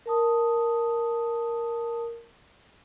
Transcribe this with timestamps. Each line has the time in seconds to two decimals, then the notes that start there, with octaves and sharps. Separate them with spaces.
0.06 A#4 A5 D#6